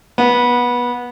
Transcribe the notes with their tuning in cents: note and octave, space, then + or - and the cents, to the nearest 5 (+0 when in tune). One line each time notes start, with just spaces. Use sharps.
B3 -20